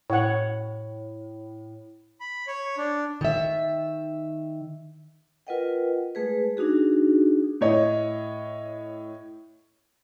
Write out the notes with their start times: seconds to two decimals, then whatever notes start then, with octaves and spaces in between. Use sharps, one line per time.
0.10 A2 C#5 F#5
2.20 B5
2.47 C#5
2.77 D4
3.21 D#3 E5
5.47 F4 A#4 B4 D#5 F#5 G5
6.15 G#3 A3 G#4 B4
6.57 D4 D#4 F#4 G#4
7.61 A2 C#5 D#5